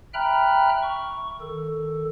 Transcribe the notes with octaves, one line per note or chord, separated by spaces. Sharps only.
E5 G5 A#5 B5 F6 F#6
C#6
D#3 A4